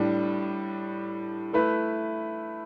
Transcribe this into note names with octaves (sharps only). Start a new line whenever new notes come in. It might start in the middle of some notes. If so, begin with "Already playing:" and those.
Already playing: A2 G3 D4
A3 E4 B4